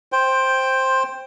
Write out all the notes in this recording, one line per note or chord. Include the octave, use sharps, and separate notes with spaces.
C5 G5